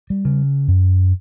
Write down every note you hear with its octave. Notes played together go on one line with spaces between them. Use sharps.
G3
C#3
F#2